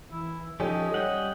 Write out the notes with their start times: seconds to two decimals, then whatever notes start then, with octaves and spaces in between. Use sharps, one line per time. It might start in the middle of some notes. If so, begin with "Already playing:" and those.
0.11 E3 E4
0.60 F3 C#4 D#4 G4 A4 C#5 D#5
0.94 G3 F#5 G5